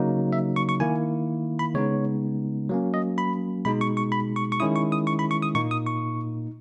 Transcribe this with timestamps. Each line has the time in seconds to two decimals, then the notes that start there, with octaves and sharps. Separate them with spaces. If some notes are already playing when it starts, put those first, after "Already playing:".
Already playing: C#3 F#3 A#3 D#4
0.33 E5
0.56 C#6
0.69 C#6
0.80 D#3 A#3 E4 G#5
1.59 B5
1.74 C#3 G#3 B3 D#4 C#5
2.69 F#3 A#3 C#4
2.94 D#5
3.18 B5
3.65 B2 G#3 D#4 B5
3.81 C#6
3.97 C#6
4.12 B5
4.36 C#6
4.52 C#6
4.60 D#3 G#3 C#4 E4 D#6
4.76 C#6
4.92 D#6
5.07 C#6
5.19 B5
5.31 C#6
5.42 D#6
5.55 A#2 A#3 D#4 C#6
5.71 D#6
5.86 C#6